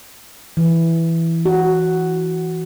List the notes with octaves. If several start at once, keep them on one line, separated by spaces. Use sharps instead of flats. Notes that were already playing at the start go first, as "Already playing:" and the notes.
E3
F#4